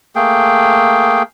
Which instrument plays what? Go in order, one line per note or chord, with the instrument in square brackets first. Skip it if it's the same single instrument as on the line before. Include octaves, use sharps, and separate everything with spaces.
[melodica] A3 A#3 G#4 G5